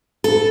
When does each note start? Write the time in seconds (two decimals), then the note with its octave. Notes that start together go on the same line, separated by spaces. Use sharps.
0.24 A4